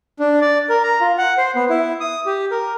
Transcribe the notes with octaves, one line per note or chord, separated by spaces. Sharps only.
D4
D5
A#4
A#5
F4
F#5
C5
B3
E4
D#6
G4
A#4